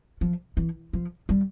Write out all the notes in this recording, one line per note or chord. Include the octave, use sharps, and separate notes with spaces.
F3
E3
F3
G3